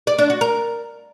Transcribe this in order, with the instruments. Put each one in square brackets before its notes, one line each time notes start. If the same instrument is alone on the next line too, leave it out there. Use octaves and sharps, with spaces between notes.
[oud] D5
D4
F#4
A#4